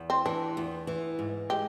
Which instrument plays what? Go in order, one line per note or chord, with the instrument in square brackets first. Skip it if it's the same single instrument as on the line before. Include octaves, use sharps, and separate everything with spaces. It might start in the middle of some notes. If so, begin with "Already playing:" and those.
Already playing: [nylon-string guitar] E2
[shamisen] C4
[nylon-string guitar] E3 [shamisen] D4
[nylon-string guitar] E2
E3
G#2
[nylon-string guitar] G#3 [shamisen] G4